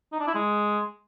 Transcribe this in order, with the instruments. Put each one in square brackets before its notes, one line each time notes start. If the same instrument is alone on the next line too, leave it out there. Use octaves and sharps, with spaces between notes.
[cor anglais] D#4
D4
E4
G#3